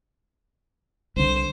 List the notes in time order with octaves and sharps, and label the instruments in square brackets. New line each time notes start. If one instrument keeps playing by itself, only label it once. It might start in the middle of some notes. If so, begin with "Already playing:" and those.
[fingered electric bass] C2 D3 [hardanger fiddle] C5